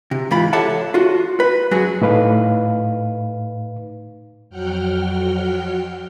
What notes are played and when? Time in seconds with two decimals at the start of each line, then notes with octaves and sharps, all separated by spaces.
0.11 C3
0.31 G#2 E3 F4 B5
0.53 G4 A4 C#5 E5 F#5 A5
0.94 F4 F#4
1.40 B4
1.71 F#2 F#3 F#4 G#4
2.02 A2 D#4 B4 F5
4.50 F2 F#3 F#5 G5 F6 G6